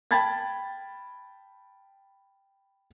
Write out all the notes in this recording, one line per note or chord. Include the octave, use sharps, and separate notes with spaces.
G5 A5 B5 G#6 A6